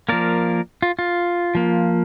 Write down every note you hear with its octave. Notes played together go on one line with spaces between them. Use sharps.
F3 A#3 A#4 D5
F4
F4
F3 A#3